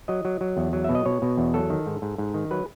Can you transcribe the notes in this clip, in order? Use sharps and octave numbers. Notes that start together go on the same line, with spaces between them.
F#3 D#5
F#3
F#3
E2
F#3
B2 E5
D#5
B2 C#5
B2
E2
F#3 A4
D#3
G#2
G#2
G#2
D#3
F#3 B4